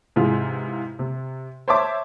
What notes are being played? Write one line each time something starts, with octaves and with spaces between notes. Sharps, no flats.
G#2 C3 E3 F4 G#4
C3
C5 C#5 E5 A5 D6